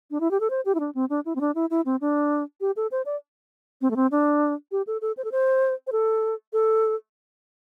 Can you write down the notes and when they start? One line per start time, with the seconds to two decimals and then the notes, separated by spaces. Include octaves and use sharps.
0.11 D4
0.20 E4
0.31 G4
0.40 A4
0.50 C5
0.65 G4
0.75 E4
0.80 D4
0.95 C4
1.10 D4
1.25 E4
1.36 C4
1.41 D4
1.55 E4
1.71 E4
1.86 C4
2.01 D4
2.61 G4
2.76 A4
2.91 C5
3.06 D5
3.81 C4
3.91 A3
3.96 C4
4.11 D4
4.72 G4
4.87 A4
5.01 A4
5.17 C5
5.24 A4
5.32 C5
5.87 C5
5.92 A4
6.53 A4